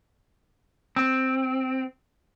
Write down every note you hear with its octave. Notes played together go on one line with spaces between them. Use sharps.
C4